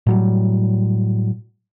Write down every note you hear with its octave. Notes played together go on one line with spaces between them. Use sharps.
A2 F#3 G3